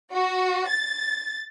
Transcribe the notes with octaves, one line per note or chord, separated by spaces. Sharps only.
F#4
A6